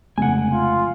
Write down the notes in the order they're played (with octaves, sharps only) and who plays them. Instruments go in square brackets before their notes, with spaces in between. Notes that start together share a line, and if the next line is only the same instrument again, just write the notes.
[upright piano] F1 [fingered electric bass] C#3 G#3 [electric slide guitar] F#5 G#5
[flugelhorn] F4